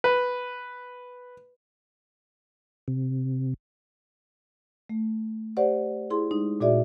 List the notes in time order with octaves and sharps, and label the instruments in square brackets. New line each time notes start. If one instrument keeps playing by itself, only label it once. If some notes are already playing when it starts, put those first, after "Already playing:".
[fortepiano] B4
[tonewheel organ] C3
[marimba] A3
G4 C5 D5 F#5
E4 G#4 C6
G#3 D#4
A#2 F#4 G#4 D5 E5